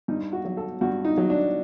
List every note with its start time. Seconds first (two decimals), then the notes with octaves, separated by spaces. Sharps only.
0.08 G2 D#4
0.33 F#4
0.45 F#3
0.57 A4
0.81 G2 F#4
1.05 D#4
1.18 F#3
1.30 D4